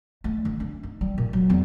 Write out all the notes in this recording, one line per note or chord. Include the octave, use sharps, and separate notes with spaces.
A3
D3
D4
D#4
G3
A#2
F#3
E2